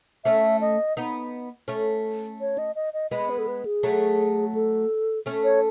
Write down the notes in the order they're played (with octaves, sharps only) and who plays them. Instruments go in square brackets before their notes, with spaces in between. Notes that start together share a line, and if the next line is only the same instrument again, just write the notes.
[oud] A3 C#4 [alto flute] E5
[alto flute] D#5
[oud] B3 D#4
A3 C#4
[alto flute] C#5
D#5
D#5
D#5
[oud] G#3 B3 [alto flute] D#5
[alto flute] B4
A4
B4
G#4
[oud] F#3 A3
[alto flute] A4
[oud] A3 C#4
[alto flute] C#5